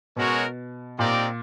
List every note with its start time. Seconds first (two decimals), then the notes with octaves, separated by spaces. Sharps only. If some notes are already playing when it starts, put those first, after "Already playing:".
0.16 B2 G#3 C#4 F#4 A#4 C#5
0.98 A#2 C4 D#4 G4 A#4 D5